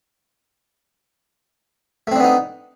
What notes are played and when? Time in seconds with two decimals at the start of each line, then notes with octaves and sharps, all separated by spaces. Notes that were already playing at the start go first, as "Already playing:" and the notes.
2.07 A3
2.12 C4
2.16 D4
2.20 B3
2.24 D#4